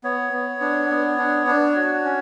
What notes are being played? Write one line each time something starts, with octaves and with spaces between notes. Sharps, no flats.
B3 C#5
B3
D4
B3
D4
D4
F#4
C#4